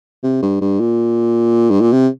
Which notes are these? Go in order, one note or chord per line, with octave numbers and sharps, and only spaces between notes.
C3
G2
G2
A#2
G2
A#2
C3